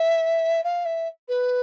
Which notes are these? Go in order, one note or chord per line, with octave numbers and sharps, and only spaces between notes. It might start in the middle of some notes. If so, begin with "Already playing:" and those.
Already playing: E5
F5
E5
B4